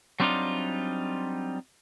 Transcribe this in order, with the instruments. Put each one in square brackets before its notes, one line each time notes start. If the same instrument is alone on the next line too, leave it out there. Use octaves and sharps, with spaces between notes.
[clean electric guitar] F#3 G3 C4 D4 D#4 F4